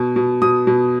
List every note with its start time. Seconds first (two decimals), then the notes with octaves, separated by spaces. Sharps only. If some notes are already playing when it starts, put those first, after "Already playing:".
Already playing: B2
0.16 B2
0.42 B2 D#6
0.67 B2